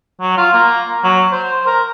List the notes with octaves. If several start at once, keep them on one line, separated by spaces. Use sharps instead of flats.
F#3
F4
A#3
F#3
C5
A#4